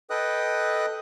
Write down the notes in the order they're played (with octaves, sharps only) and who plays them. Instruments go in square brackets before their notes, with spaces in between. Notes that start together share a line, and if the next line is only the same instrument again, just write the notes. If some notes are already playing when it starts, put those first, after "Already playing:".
[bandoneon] A4 B4 D#5 G5 D#6 F#6